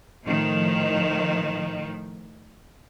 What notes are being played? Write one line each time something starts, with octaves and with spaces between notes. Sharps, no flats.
A2 D#3 F3